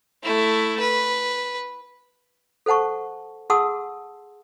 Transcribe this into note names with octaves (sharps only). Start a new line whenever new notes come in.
A3 E4
B4
A4 C5 F#5 A5 C#6
G#4 F#5 A5 C6 D#6 E6